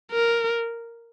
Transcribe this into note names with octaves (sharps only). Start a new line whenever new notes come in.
A#4